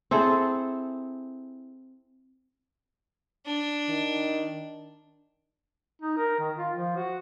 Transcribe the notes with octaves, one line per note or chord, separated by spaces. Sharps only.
C4 E4 G#4 A4
D4
D#3
D#4
A#4
D#3
F4
F3
F#4